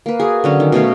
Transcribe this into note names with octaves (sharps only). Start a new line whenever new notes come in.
A#3 B4
F#4 G#4
D3 F#3 C#4
D#3
B2 A3 C#5 F5